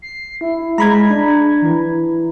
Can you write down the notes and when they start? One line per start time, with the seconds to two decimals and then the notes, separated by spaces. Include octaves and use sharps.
0.02 C7
0.41 E4
0.78 G#3 A#5 B5 G#6
1.09 D4
1.62 E3